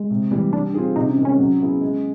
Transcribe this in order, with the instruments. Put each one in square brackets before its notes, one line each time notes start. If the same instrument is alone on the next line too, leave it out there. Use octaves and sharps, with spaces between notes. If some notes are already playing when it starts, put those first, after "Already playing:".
Already playing: [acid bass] G#3
[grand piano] C3
E3 G3
[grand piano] G3 [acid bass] D4
[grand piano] C4 F4 G#4 [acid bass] D#4
[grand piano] C3 [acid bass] D#4
[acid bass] C#4
[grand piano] D#3 G#3
[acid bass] C#4
[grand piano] F#3
B3 E4 G#4
G#3